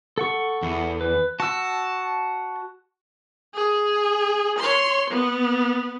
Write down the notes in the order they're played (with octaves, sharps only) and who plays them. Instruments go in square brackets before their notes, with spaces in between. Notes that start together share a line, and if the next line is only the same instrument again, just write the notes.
[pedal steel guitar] A4 F#5 C#6
[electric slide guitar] E2
[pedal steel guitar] B4
[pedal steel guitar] F#4 E6 [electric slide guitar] A5
[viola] G#4
C#5 C6
B3